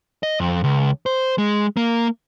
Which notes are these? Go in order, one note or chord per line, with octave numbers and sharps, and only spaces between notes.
D#5
F2
C#2
C5
G#3
A#3